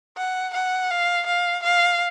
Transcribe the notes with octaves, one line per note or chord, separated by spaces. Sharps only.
F#5
F#5
F5
F5
F5